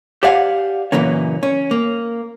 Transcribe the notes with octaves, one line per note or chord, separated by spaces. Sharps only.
G4 C5 D5 F5 F#5 G#5
F#2 A#2 C#3 E3 A#3 C#4
C#4
A#3